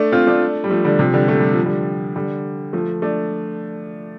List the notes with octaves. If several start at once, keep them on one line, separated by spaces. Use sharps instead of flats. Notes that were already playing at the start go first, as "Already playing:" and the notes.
Already playing: A3 D4
C4 F4
A3 D4
G3
F3 A3
D3 G3
C3 F3
D3 G3
A3
G3
F3
D3 G3
D3 G3
F3 A3
A3 D4